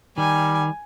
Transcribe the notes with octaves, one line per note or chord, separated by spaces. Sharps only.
D#3 G3 G#5